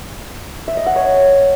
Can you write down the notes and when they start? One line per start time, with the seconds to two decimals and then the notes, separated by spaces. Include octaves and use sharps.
0.68 E5
0.77 D#5
0.86 F#5
0.96 C#5